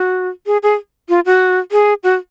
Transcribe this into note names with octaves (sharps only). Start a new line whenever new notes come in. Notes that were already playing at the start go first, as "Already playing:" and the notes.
Already playing: F#4
G#4
G#4
F4
F#4
G#4
F#4